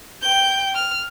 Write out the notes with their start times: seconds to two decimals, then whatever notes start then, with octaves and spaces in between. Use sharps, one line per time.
0.22 G5 G6
0.75 F6